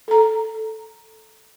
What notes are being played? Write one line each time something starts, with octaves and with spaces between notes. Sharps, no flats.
A4 A#5